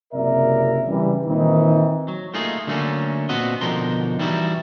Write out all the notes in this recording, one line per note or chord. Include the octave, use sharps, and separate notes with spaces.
F#1 C3 A#4 D5 E5
C#3 E3 G3
A#2 D#3 E3 C4 D#4
F#3
A3 A#3 D#4 F4 G#4
D3 F#3 A3 A#3 C#4
A#2 B3 C4 F#4 D#5
B2 D3 F3 D#4 A#4 C6
E3 G3 D#4 E4 F#4